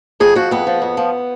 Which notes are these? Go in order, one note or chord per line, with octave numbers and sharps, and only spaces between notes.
F2 G#4
F3 F#4
F2 B3
F3
F2
F3